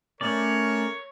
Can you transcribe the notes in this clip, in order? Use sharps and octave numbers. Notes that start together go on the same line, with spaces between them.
A3 C#4 A#4 C#5 D5